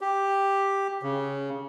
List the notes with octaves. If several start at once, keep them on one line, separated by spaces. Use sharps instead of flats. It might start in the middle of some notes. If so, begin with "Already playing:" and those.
G4
C#3